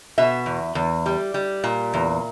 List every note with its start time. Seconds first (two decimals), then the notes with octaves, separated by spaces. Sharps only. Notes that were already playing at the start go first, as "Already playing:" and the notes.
0.18 B2 E5
0.46 E2
0.75 E2
1.06 G3
1.34 G3
1.64 A#2
1.94 E2